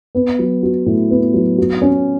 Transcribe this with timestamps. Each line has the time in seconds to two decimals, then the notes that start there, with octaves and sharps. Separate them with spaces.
0.15 B3
0.39 F#3
0.63 F#4
0.86 A2
1.11 B3
1.34 F#3
1.58 F#4
1.82 C#4